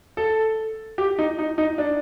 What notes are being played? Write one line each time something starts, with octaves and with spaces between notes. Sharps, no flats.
A4
G4
D#4
D#4
D#4
D4